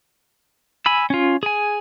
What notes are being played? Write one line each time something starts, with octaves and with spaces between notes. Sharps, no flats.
G#5 B5 E6
C#4 F4
G#4 G#5